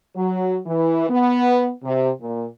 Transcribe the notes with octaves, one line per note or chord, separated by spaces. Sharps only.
F#3
E3
B3
C3
A#2